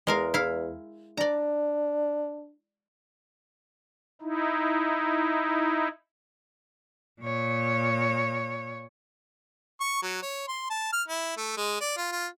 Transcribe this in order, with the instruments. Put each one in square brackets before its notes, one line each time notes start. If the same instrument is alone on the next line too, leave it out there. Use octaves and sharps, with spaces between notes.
[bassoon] E2 [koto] G#3 A#4 F5
[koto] E4 F5
[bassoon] D4 [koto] D5 A#5
[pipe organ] D#4 E4
[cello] A#2 C#5
[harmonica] C#6
F#3
C#5
C6
A5
F6
E4
A3
G#3
D5
F4
F4